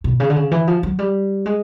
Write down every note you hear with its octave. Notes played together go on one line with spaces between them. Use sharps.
B2
C#3
D3
C#3
E3
F3
F#3
G3
G#3